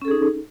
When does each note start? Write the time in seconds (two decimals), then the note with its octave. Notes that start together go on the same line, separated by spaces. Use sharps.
0.02 C#4
0.05 A4
0.08 G#4
0.11 D#4